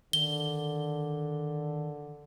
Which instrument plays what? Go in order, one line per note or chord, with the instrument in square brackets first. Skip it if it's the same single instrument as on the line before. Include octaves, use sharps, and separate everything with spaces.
[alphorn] D3 [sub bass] D#3 [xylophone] G7